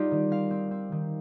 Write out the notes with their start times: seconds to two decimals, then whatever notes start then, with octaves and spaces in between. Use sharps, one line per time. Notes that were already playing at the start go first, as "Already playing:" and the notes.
Already playing: G3 D#4 F4 G4
0.11 D#3
0.31 C4 F5
0.51 C4
0.71 C4
0.92 D#3